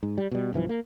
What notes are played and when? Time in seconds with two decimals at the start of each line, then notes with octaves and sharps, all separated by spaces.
0.03 G#2
0.18 G3
0.31 B2 G3
0.53 B1 G2 E3 F3
0.69 A#3